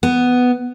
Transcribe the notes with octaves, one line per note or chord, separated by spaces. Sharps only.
B3